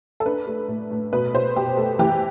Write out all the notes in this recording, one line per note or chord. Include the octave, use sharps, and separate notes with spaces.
A4
D4 B4
A3
A2
A2
B2 B4
B2 C5
B2 G4
A3
E3 G4